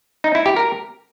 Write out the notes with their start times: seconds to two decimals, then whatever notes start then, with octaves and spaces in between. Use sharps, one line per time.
0.24 D#4
0.35 E4
0.46 G4
0.56 A#4